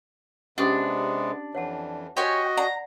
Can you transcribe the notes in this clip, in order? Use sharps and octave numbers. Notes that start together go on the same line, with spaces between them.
C3 G#3 B3 C#4 D4 G4 D#6
F2 E3 C#5 F#5 A5
F#4 G4 C#5 D#5 G#5 C6
D5 F#5 A#5